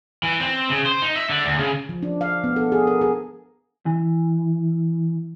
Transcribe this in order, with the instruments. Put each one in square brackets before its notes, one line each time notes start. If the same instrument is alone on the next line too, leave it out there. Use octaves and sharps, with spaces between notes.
[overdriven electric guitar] E3
C4
C#3
C5
D#4
E5
D3
D2
C#3
[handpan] F3
D4
F5
B3
A4
G#4
A#4
G#4
[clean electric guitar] E3